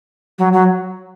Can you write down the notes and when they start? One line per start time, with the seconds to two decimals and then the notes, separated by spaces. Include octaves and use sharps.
0.39 F#3
0.53 F#3